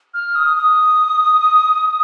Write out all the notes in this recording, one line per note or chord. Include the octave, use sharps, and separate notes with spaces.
F6
D#6
D#6